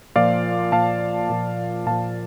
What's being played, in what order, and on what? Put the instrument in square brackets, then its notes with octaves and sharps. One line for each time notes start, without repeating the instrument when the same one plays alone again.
[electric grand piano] A#2 F3 D5 F5
A#2 F3 F5 A5
A#2 F3
A#2 F3 F5 A5